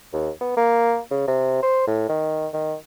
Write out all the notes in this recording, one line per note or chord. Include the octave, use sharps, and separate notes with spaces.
D#2
B3
A#3
C#3
C3
C5
A2
D#3
D#3